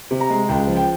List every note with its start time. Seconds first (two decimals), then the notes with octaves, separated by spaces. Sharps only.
0.11 C3
0.20 A#5
0.30 G#3
0.48 C#2 G5
0.67 F3
0.77 G5